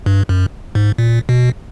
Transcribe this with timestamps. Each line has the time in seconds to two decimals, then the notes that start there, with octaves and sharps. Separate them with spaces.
0.06 G2
0.29 F#2
0.75 G#2
0.98 A#2
1.29 B2